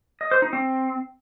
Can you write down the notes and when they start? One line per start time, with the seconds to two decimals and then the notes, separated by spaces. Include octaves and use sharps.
0.21 D#5
0.31 C5
0.42 D#4
0.53 C4